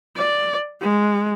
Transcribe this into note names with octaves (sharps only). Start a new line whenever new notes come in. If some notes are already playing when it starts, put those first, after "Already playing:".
D5
G#3